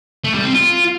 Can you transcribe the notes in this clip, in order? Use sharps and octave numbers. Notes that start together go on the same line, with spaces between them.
A3
G3
C4
F4